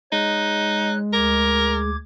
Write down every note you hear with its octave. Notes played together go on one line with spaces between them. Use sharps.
G#3 D#4 C#5 F#6
D2 A#4 D6 G#6